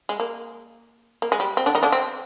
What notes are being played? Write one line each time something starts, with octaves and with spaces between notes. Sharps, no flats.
G#3
A#3
A#3
G#3
G3
C4
D3 D4
D#3 D#4
D3 D4
C4